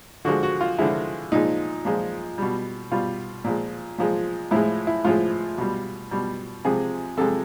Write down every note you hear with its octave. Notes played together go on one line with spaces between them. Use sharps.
D3 F3 G#3 F#4
F#4
F4
D3 F3 G#3 E4
A#2 F3 G#3 D#4
A#2 F3 G#3
B2 G3
B2 G3 F4
A#2 F3 G#3
A#2 F3 G#3
A2 F3 G#3 E4
E4
A2 F3 G#3 F4
B2 G3
B2 G3
C3 F3 G#3 G#4
C3 F3 G#3 A4